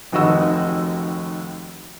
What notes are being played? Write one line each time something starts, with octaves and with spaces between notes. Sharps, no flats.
F1 D#2 F#4 D#5 E6